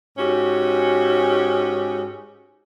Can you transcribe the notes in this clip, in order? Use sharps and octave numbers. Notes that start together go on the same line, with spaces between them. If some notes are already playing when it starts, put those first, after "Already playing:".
G#2 C#4 F#4 G4